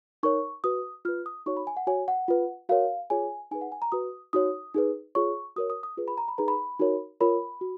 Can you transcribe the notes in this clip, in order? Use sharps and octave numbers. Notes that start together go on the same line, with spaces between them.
D#4 A#4 C#5 C#6
F#4 B4 D#6
F4 B4 F6
D#6
D#4 F#4 C#5 C#6
B5
G#5
F#5
F#4 C#5 G#5
F#5
F4 B4
F#4 A#4 C#5 F5
F4 G#4 C#5 G#5
D#4 G#4 B4 G#5
F#5
G#5
A#5
F#4 B4 D#6
D#4 F#4 C#5 D#6
D#4 G#4 B4
F4 G#4 C#5 C#6
F#4 A#4 C#5 D#6
D#6
D#6
F4 G#4 B4
B5
A#5
B5
D#4 G#4 B4 A#5
B5
D#4 F#4 A#4 C#5
F4 A#4 C#5 B5
F#4